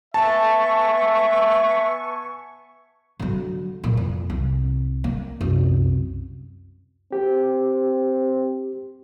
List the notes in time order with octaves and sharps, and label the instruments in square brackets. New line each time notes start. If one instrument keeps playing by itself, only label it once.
[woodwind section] B3 G#5 C#6 [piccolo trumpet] E5 [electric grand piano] A5
[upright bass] D3 F#3
A#2
F2
C2
A#3
C2 F#2
[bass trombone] C4 [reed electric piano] G4